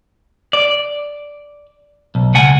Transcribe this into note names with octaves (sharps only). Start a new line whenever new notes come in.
D5
B1
C#2 F#5 G#5